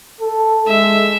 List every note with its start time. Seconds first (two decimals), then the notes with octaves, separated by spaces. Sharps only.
0.21 A4
0.68 G#3 E5